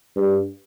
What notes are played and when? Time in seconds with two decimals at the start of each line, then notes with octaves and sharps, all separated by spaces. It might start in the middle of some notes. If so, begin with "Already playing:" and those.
0.16 G2